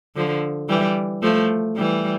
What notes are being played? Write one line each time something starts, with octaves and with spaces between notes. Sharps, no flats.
D3 F3
E3 G3
F3 A3
E3 G3